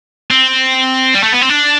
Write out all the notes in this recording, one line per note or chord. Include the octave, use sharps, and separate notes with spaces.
C4
G3
A3
B3
C4
D4